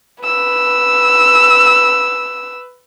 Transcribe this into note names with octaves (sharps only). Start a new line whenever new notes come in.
B4 E6